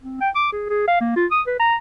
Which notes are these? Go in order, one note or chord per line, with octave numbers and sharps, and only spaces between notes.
C4
G5
D6
G#4
G#4
F5
A#3
F4
D#6
B4
A#5